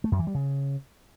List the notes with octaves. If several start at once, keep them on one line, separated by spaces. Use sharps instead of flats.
A3
F#2
E3
G3
C#3